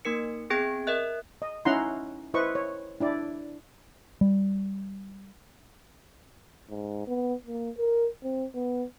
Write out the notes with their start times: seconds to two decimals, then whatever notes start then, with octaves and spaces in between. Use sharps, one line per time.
0.05 A#3 D#4 A#4 C#7
0.50 B3 C4 G#4 G5 G#6 D7
0.87 A#4 D#5 E5 F#6
1.42 D#5
1.65 C#4 D#4 E4 F#5 A#5 C6
2.34 E4 B4 C5 D#5 C#6
2.55 C#5
3.00 D4 E4 D5
4.21 G3
6.69 G#2
7.08 B3
7.46 A#3
7.78 A#4
8.23 C4
8.54 B3